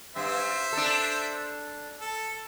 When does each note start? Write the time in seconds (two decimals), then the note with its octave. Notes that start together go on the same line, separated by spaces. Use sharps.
0.16 G2 C5 E5
0.73 D4 A4
2.00 A4